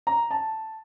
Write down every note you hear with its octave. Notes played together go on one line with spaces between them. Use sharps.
A#5
A5